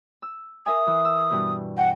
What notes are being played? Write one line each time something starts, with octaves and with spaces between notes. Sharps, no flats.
E6
A#4 E5 G#5 D#6
E3 E6
E6
G2 B2
F#5 G5